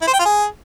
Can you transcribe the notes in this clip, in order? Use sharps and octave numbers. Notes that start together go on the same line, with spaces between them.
E4
C5
G5
F4
G#4